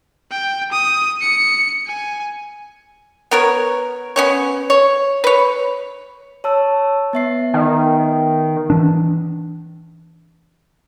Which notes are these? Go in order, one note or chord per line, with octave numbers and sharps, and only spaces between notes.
G5
D#6
C#7
G#5
B3 A#4 C#5
B3 C#4 C#5
C#5
B4 C#5
C#5 A5 E6
B3 E5 C7
D#3
E3 D4